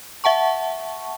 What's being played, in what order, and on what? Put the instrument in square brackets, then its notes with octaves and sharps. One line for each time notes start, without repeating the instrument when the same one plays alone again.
[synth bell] E5 F#5 A5 C#6